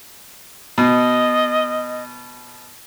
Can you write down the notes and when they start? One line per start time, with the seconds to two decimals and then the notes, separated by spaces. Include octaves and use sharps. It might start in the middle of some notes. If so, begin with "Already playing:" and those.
0.78 B2 D#5